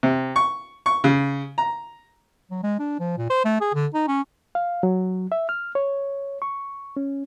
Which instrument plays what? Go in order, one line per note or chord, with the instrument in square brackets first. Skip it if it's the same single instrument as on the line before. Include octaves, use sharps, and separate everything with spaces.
[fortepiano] C3
C#6
C#6
C#3
A#5
[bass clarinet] F#3
G#3
D4
F3
A#2
C5
A3
G#4
D3
D#4
C#4
[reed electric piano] F5
F#3
E5
F6
C#5
C#6
C#4